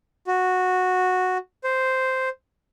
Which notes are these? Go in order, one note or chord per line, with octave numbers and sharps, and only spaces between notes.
F#4
C5